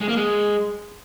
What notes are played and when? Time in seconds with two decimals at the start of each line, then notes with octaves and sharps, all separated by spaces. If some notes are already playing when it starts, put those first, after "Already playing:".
0.01 G#3
0.09 A#3
0.17 G#3